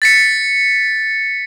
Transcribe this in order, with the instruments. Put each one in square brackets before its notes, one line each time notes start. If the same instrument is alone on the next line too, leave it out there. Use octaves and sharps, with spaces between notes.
[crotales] A6 B6 C#7